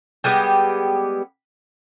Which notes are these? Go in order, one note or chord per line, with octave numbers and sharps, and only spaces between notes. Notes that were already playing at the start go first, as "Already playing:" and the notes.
G3 G#3 B3 G4